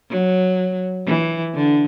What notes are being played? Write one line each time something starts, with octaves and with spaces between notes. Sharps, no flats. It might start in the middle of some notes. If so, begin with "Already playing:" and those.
F#3
E3
D3